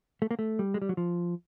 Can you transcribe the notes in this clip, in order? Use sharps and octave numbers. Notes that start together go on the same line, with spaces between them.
A3
A#3
A3
G3
G#3
G3
F#3
F3